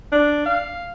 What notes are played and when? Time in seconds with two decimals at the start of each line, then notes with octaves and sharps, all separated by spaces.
0.12 D4
0.46 F5